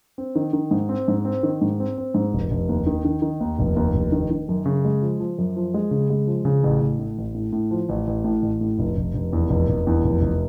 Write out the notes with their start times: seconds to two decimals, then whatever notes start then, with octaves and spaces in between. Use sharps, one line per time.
0.18 C4
0.35 D#3
0.53 D#3
0.71 G#2
0.89 C4
1.08 G#2
1.25 C4
1.43 D#3
1.61 G#2
1.80 C4
1.98 C4
2.15 G#2
2.34 F1
2.51 F1
2.69 D#2
2.87 D#3
3.05 D#3
3.22 D#3
3.41 D#2
3.59 F1
3.76 D#2
3.95 F1
4.12 D#3
4.31 D#3
4.49 F#2
4.66 C#3
4.85 G#3
5.02 F3
5.20 F3
5.38 F#2
5.56 F3
5.74 G#3
5.91 C#3
6.10 G#3
6.27 F3
6.45 C#3
6.64 A1
6.81 A1
6.99 A2
7.18 A1
7.34 A2
7.52 A2
7.71 F3
7.89 A1
8.07 A1
8.24 A2
8.42 A1
8.61 A2
8.79 F1
8.97 F1
9.14 F1
9.33 E2
9.50 F1
9.69 F1
9.87 E2
10.04 F1
10.21 F1